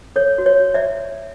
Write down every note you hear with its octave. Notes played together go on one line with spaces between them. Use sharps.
A4 C#5
F#4
C#5
F#4
D5 E5